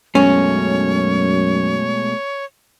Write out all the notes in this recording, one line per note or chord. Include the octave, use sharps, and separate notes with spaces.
F#2 B2 G#3 A3 C#4 C#5